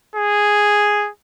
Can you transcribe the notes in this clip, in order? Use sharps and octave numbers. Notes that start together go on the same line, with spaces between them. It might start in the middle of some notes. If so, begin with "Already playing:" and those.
G#4